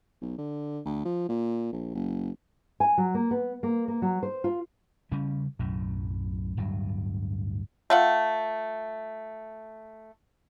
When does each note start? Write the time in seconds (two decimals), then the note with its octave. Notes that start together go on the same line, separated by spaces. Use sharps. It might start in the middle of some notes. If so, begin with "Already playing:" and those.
0.21 B1
0.38 D3
0.85 D2
1.05 F3
1.29 A#2
1.73 A#1
1.95 F#1
2.80 G#5
2.98 F#3
3.14 A#3
3.31 B3
3.63 A#3
3.88 A#3
4.02 F#3
4.23 C5
4.44 F4
5.12 C#3 G3 C#4
5.59 B1 F#2 A2
6.57 D1 G2 F#3
7.90 A3 F4 F#5